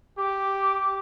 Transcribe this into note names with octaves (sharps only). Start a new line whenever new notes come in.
G4 D6